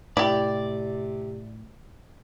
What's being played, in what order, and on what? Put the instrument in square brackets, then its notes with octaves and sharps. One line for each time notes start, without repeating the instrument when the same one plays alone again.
[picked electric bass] A2 [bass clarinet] C3 [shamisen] E4 G4 [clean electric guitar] D5